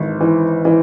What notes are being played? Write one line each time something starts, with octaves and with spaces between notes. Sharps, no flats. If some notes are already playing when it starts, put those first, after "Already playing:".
Already playing: G#1 E3
E3
E3